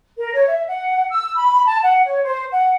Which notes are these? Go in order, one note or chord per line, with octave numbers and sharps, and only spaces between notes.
A#4
C#5
E5
F#5
E6
B5
A5
F#5
C#5
C5
F#5